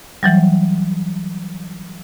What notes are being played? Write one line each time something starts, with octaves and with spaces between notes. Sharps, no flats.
E3 F#3 G3